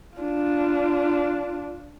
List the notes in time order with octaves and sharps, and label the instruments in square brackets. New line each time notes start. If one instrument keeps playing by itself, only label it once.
[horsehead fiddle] D4 F4